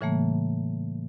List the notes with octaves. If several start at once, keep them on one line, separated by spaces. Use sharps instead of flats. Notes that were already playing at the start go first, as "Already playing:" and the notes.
A2 C#3 E3 G3 A3 A#3